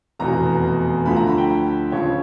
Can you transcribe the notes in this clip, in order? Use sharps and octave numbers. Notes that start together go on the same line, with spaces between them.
F1 E2 B2 A#5
D2 D3 F3 B5
A#5
B5
G5
C#2 C#3 F3 C#5